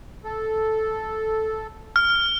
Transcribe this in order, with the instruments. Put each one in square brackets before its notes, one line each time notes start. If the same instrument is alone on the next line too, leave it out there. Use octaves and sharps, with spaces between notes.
[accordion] A4
[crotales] F6